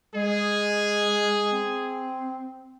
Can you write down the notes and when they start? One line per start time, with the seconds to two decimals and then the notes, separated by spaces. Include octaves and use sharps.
0.15 G#3 G#4
1.52 C4